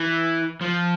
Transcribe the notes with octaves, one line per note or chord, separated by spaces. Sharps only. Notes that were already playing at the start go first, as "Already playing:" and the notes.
Already playing: E3
F3